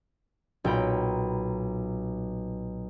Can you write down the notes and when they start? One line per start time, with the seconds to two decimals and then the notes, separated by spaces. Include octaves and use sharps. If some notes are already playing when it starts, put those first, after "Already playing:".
0.64 B1 A#2 G5 A#5 B5